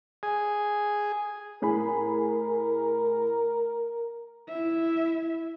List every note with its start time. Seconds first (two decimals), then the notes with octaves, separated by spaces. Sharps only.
0.23 G#4
1.62 A2 G#4 A#4 B5
4.49 E4 E5